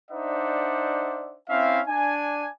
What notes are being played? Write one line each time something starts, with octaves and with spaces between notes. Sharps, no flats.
D4 D#4 C5 D5 E5 F#5
C4 C#4 E4 E5 F5
D4 G#5